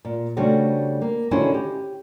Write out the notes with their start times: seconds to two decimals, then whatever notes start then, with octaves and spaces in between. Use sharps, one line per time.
0.05 A#2
0.37 C#3 G3 A3 D4 F#4 C5
1.01 A#3
1.31 D3 D#3 C#4 E4 F#4 C5
1.54 G4